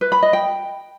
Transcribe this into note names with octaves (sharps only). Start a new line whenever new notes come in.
B4
B5
D#5
G5